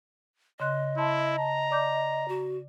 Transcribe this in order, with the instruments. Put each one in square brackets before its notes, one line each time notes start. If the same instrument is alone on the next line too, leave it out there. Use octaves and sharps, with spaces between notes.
[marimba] C#3 C6 F#6 [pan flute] D#5
[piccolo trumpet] E4 [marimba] A5 C6
[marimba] A5 [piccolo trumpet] A#5
[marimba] D5 D6 G6
[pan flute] F#4